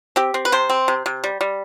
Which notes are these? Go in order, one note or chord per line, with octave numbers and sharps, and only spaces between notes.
C4 G4
C4
B4
C3 C5
C4
C3
C3
G3
G3